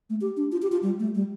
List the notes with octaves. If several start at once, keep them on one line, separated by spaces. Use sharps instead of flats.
A3
G4
D4
F4
G4
F4
G3
A3
G3